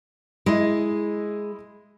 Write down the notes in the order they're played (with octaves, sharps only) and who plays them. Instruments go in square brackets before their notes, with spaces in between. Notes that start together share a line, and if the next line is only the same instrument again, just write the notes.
[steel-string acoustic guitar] G#3 [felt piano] E4 D#5